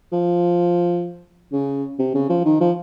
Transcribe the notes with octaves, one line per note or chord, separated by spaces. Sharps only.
F3
C#3
C3
C#3
F3
D#3
F3